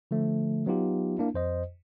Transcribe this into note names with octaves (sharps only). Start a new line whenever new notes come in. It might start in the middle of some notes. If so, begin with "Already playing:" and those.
D3 F3 A3
F#3 B3 D#4 F4 G4
A#3 D4 E4
F2 C5 D#5